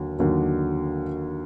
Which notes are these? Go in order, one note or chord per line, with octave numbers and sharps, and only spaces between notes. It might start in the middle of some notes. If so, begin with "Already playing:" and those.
Already playing: D#2 D3 F#3
D#2 D3 F#3